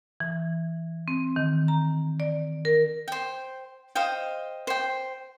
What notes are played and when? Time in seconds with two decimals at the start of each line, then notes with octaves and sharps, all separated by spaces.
0.20 E3
1.08 C4
1.36 D#3
1.68 A#5
2.20 D5
2.65 A#4
3.08 C5 G5
3.95 C5 D#5 F5 G5
4.67 C5 G5